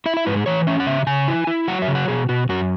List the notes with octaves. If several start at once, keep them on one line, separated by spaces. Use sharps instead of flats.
E4 E5
E5
G#2 B4
G#4
E3 C#5
C#4 E5
F#5
C#3 E5
C#3 G#5
E4
E4
F#3 F#5
E5
C#3
F#5
B2 G#4
B2 F#4
F#2 F#4